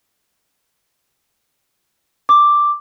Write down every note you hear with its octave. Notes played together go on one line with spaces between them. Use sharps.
D6